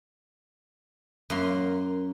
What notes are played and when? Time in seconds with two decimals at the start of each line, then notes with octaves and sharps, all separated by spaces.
1.30 F#2 A#3 C6